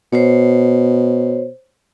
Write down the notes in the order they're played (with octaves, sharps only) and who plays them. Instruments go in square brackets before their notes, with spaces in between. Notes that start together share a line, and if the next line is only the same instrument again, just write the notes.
[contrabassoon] B2 [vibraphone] C5 C#5